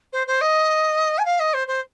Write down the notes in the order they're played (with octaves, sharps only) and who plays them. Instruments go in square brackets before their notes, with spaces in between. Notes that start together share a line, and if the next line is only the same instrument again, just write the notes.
[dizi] C5
C5
D#5
G#5
F5
D#5
C5
C5